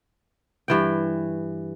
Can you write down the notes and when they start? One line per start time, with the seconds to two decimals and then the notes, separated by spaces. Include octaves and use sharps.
0.68 G2 E3 G5